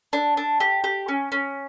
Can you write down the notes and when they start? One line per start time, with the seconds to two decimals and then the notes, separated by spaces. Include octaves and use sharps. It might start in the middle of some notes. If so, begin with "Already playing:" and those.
0.13 D4
0.37 D4
0.60 G4
0.84 G4
1.08 C#4
1.32 C#4